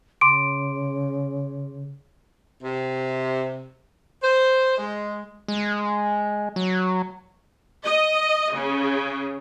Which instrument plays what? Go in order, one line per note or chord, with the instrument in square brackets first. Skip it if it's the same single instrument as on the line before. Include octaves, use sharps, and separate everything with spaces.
[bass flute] C#3 [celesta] C6 D6 D7
[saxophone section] C3
C5
G#3
[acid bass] G#3
F#3
[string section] D#5
C#3